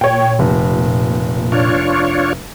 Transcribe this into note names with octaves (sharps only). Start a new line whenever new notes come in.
A#2 C#5 G5
F1
D4 F4 C#5